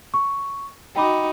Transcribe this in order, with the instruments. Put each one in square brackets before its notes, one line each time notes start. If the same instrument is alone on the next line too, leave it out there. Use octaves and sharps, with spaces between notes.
[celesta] C#6
[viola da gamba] D#4 F#4 [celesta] G5 B5 D6